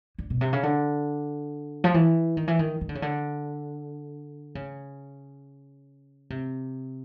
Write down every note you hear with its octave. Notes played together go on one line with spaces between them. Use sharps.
D3
B2
C3
C#3
D3
F3
E3
D#3
E3
D#3
D#3
D3
C#3
D3
C#3
C3